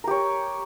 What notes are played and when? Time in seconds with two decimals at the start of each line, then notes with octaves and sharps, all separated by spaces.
0.04 A#4
0.07 G4
0.11 C#5